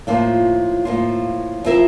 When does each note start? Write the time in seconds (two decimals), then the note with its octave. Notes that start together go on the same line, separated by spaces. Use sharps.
0.07 A2 F3 A#3 F4
0.85 A2 F3 A#3 F4
1.64 F3 C4 E4 A#4 E5